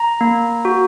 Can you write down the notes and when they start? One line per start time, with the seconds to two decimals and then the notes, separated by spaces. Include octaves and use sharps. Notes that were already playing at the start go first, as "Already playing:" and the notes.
Already playing: A#5
0.21 A#3
0.65 F#4